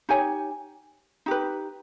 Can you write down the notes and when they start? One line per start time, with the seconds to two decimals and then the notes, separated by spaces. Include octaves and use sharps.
0.09 D#4 G4 C#5 G#5
1.26 D#4 G4 B4